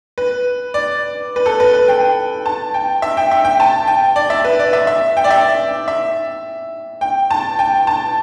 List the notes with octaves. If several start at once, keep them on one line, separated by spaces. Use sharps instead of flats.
B4
D5
B4
A4
B4
B4
G5
A5
G5
E5
G5
E5
G5
A5
G5
D5
E5
B4
D5
E5
E5
G5
D5
E5
E5
G5
A5
G5
A5